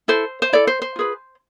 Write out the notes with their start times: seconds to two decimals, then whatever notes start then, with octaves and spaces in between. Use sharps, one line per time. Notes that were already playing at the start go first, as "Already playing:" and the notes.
0.08 E4 A4 C5
0.42 C5
0.53 E4 A4 D5
0.67 C5
0.82 C5
0.96 F4 G#4 B4